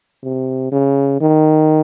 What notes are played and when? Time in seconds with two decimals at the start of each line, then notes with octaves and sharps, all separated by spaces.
0.23 C3
0.72 C#3
1.21 D#3